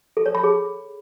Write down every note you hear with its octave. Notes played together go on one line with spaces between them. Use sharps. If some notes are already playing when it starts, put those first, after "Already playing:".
A4
C#5
B5
G#4